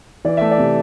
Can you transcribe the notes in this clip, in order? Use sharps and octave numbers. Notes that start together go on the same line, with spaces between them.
E3 D5
A3 E5
D5
C3